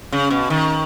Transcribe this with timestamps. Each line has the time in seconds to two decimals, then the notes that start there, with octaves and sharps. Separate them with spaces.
0.13 C#3
0.31 B2
0.50 D#3